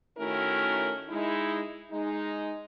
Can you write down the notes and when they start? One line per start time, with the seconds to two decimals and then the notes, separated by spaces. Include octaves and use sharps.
0.18 D#3 A3 C#4 E4 F#4 A#4
1.09 G#3 D#4 E4
1.91 G#3 D#4